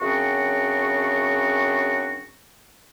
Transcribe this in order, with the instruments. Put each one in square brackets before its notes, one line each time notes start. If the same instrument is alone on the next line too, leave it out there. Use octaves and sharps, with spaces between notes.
[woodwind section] F#2 C#3 C4 D4 F#4 C#6